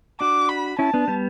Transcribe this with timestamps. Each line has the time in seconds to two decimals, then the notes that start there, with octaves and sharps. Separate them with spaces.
0.20 D4 F#4 D6
0.49 B5
0.79 C#4 E4 A5
0.94 B3 D4
1.08 G3 B3